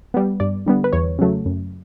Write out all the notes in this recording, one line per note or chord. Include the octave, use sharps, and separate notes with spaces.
G3 B3
G2 D5
D3 G3 B3
B4
E2 C#5
C#3 F#3 A3
F#2